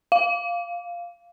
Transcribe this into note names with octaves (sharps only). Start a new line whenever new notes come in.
F5